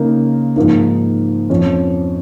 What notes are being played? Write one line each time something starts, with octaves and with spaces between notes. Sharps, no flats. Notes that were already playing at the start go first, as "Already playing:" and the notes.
Already playing: C#3 A#3 D#4 A#4
G#2 F3 A#3 D#4
F2 F3 C#4